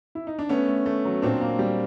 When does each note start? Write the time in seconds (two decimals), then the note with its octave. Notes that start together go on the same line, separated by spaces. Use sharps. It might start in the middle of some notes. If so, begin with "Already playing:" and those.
0.15 E4
0.27 D#4
0.39 D4
0.49 A3 B3 C#4
0.68 A3
0.86 A3
1.05 F#3
1.22 A#2 C4 D4
1.41 A#3
1.59 G3